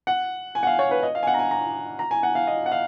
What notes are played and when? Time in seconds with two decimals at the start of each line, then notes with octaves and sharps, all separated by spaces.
0.07 F#5
0.55 G#5
0.63 F#5
0.67 F5
0.79 C#5
0.91 B4
1.03 D#5
1.15 F5
1.23 G#5
1.27 F#5
1.34 A#5
1.39 G#5
1.51 A#5
1.99 A#5
2.11 G#5
2.23 F#5
2.35 F5
2.47 D#5
2.66 F#5
2.72 F5